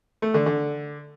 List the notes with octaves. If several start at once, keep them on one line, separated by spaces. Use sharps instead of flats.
A3
D3
D3